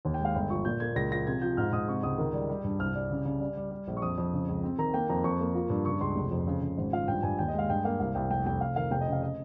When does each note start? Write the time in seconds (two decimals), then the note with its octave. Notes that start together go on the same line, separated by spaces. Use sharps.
0.05 D#2
0.14 G5
0.19 G#3
0.25 F5
0.35 G1 G5
0.50 F3 C#6
0.65 A#2 G6
0.80 A#3 G#6
0.95 C#2 A#6
1.11 F3 A#6
1.27 C3 G#6
1.42 F3 G6
1.57 G#2 F6
1.72 G#2 D#6
1.88 C3 C#6
2.03 C#2 D#6
2.18 D#3
2.33 G3
2.49 G3
2.64 G2
2.79 C2 F6
2.95 G3
3.11 C#3
3.25 C#3
3.40 G3
3.57 G3
3.71 G3
3.87 A#1
3.97 C#6
4.02 F2 D#6
4.18 F2
4.33 C#3
4.48 C#2
4.63 C4
4.78 D#3 A#5
4.94 A#3 G5
5.09 F2 A#5
5.24 F2 C#6
5.40 A#3
5.55 F3
5.70 G2
5.85 C#3 C#6
6.00 C#2 C6
6.16 F1
6.31 F2
6.47 C#3
6.62 C#3
6.78 G#1
6.92 F3 F5
7.08 G2 G5
7.23 G2 G#5
7.38 D#2 G5
7.48 D#5
7.53 G#3
7.59 F5
7.69 G2 G5
7.84 A#3 F5
8.00 C2 F5
8.15 C2 G5
8.30 F1 G5
8.46 F1 G5
8.60 F1 F5
8.76 D#3 F5
8.91 F1 G5
9.01 D#5
9.07 C#3 F5
9.22 D#5